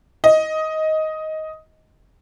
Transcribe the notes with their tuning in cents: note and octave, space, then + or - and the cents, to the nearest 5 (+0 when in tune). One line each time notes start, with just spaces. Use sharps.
D#5 +10